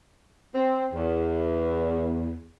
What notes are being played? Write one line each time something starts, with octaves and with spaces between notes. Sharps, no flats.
C4
E2